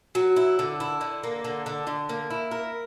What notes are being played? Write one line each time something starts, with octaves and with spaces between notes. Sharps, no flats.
F#3
E4
D3
E4
D3
A#3
D3
D3
D3
A#3
E4
A#4